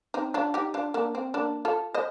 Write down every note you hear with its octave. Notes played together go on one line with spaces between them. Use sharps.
C4 D#4
D4 F4
D#4 G4
D4 F4
A#3 D4
C4
A#3 D4
F4 A4
C5 D#5